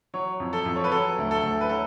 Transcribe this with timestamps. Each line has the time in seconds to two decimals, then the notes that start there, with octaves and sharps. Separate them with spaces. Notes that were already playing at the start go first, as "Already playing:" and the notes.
0.14 F#3 C#5
0.40 F2
0.53 A4
0.66 F2
0.76 C#5
0.84 B4
0.92 F#3 A4
1.18 D2
1.31 A4
1.43 D2
1.61 B4
1.69 F#3 A4